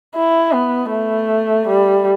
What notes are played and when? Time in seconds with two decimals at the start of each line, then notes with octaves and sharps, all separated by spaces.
0.15 E4
0.54 B3
0.91 A3
1.68 G3